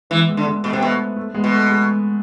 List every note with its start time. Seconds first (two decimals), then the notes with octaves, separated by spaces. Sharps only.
0.10 E3 G#3 B3
0.29 G#3 B3
0.37 D3 A3
0.45 G#3
0.63 B2 A3
0.73 C3 B3
0.82 B2 A3
1.16 A3
1.35 G#3 B3
1.44 B2
1.52 A3
1.70 G#3